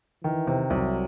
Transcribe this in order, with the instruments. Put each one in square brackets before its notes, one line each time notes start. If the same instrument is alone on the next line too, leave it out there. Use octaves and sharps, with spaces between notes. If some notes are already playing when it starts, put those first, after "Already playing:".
[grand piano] D#3 [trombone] E3
[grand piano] C3
[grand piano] C2 [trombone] F#3